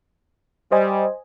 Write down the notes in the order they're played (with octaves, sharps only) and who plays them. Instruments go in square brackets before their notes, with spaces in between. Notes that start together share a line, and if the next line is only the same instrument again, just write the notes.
[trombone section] G3 [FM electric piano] C5 D#5 G#5